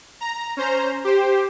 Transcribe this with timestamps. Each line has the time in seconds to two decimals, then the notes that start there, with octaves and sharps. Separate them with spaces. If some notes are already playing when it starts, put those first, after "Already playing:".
0.21 A#5
0.57 C#4 C5 A#5
1.04 G4 C5